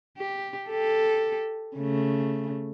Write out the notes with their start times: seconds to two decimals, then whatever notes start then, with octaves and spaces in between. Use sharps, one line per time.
0.18 G4
0.69 G4 A4
1.76 C#3 A3